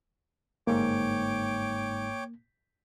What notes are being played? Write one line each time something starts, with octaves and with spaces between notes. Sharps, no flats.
G1 G#2 A#3 C#5 G5 D6